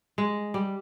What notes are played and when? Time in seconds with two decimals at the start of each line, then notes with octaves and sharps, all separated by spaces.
0.18 G#3
0.54 G3